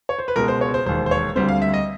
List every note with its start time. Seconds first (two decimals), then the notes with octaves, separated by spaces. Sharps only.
0.09 C#5
0.19 C5
0.28 B4
0.36 C#2 B2 G#3 A#4
0.48 C5
0.61 C#5
0.74 C5
0.86 E1 D#2 D#3 C5
1.06 C5
1.11 C#5
1.36 D2 D3 G3 C4 C5
1.49 F5
1.62 E5
1.74 D#5